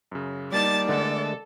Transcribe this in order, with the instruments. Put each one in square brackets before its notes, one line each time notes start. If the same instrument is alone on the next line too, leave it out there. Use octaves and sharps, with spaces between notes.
[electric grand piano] F#2 C#3
[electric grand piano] G3 A#3 D#4 [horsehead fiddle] D5 [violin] A5 A6
[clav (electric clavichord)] D3 G#3 A3 [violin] A4 [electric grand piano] A#4 E5 F#5